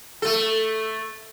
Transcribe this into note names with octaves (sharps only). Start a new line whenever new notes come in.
A3 A4